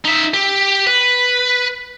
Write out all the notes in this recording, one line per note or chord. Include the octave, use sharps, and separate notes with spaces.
D#4 E5
G4
B4